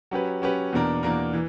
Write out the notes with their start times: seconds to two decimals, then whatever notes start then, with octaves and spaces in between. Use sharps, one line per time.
0.11 F#3 C#4 G4 B4
0.42 F#3 C#4 G4 B4
0.72 E2 B2 A#3 D4 A#4
1.03 E2 B2 A#3 D4 A#4
1.33 E3